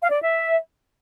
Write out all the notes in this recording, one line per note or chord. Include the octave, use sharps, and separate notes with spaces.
F5
D5
E5